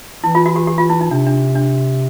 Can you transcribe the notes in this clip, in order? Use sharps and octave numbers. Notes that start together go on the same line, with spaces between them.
E3 E4
F4
F#4
G4
G4
F4
E4
D#4
C3 D4
D4
D4